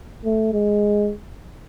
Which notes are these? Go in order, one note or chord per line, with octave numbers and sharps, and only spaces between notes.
A3
G#3